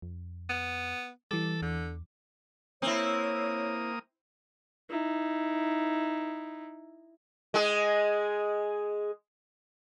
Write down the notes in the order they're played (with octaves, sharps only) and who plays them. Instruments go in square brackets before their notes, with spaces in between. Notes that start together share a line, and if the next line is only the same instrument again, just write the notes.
[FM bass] F2
[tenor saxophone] B3
[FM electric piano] E3 D6 [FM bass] G3 [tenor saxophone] A4
[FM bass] E2 [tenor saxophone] D3
[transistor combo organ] A#3 D#6 [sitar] C4 E4 [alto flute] C#5
[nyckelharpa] D#4 E4
[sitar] G#3 G#4